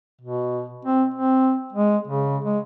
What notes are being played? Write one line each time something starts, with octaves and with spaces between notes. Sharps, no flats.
B2
C4
C4
G#3
C#3
G#3